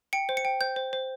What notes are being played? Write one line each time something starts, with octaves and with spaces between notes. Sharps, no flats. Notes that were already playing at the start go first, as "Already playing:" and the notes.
G5 C#7
C5
C#7
G5
C5 G6
C5
C5